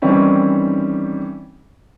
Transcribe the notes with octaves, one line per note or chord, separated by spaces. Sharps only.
D#3 E3 G3 C4 C#4 D#4